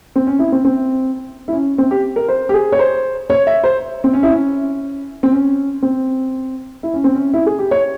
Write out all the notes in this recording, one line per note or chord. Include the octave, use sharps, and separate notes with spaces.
C4
C#4
E4
C4
C4
E4
C#4
C4
G4
A#4
C5
G4
G#4
C#5
C5
C#5
E5
C5
C4
C#4
E4
C#4
C4
C#4
C4
E4
C#4
C4
C#4
E4
G#4
G4
C#5